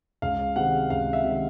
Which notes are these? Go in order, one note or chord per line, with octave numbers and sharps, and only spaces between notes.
C#2 F5
C3 D#3 G#3 F#5
C#2 F5
E5
C3 D#3 G#3